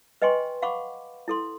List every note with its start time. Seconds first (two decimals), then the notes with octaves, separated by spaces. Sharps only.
0.22 B4 D#5 G5 G#5 C6 C#6
0.62 F5 F#5 B5 C#6 D6
1.28 E4 A4 C6